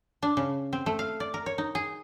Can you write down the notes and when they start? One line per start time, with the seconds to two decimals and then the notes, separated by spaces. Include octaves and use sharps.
0.23 D4
0.37 C#3
0.73 C4
0.86 A3
0.99 F5
1.20 D5
1.34 A#4
1.46 C#5
1.58 D#4
1.75 G#4